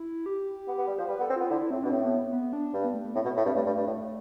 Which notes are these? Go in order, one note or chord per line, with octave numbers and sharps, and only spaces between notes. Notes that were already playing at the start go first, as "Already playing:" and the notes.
Already playing: E4
G4
B3
B3
G3
F3 C5
G3 B4
B3 A4
C4
B3 F4
D3 E4
A2 C4
B2 D4
A2 C4
B3
B3
D4
G2
B3
A3
A3
A2 C4
B2 B3
A2
G2 C4
G2 A3
G2
G2
A2